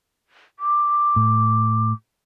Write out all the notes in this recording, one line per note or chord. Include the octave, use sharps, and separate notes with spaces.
D6
A2